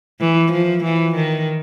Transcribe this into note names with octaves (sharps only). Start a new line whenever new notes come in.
E3
F3
E3
D#3